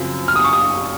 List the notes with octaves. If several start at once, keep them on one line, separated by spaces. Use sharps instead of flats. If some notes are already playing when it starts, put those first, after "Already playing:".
Already playing: F#2 C#3 F3 C4
F6
D#6
C#6
D#6